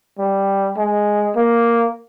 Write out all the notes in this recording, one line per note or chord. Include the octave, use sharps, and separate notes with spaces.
G3
G#3
A#3